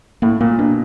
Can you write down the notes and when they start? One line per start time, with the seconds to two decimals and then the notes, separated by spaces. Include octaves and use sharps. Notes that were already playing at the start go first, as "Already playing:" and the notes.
0.22 A2 A#3
0.41 A#2 A#3
0.59 B2 D4